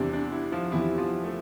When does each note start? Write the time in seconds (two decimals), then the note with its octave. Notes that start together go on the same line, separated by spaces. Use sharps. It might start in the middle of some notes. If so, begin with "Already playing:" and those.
Already playing: E2 C3 E3 G3 D4
0.13 D4
0.32 E4
0.52 F3 F4
0.72 E2 C3 E3 G3 E4
0.98 F3 F4
1.24 A3 A4